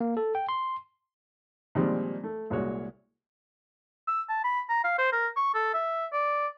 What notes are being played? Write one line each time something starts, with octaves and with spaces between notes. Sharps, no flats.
A#3
A4
G5
C6
A#2 D#3 F3 G3 G#3 C4
A3
C2 A#2 G#3 F#4 C#5
E6
A5
B5
A#5
F5
C5
A#4
C#6
A4
E5
D5